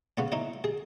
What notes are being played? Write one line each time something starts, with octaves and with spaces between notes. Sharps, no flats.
C#3 B3 C#4
D#4 E4 C#5
G#4